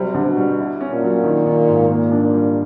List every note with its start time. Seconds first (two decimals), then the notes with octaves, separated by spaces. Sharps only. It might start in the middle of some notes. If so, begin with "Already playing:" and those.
Already playing: C3 F#3 G3
0.14 D3
0.26 B2
0.36 G3
0.59 E4
0.81 C#4
0.92 A#2
1.03 F#3
1.24 D#3
1.46 D#3
1.68 G#2
1.90 A#2 A#3
2.11 D4
2.23 A#2
2.33 G3